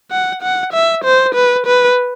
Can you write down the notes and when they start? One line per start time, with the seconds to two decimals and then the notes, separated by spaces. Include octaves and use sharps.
0.11 F#5
0.42 F#5
0.73 E5
1.05 C5
1.35 B4
1.66 B4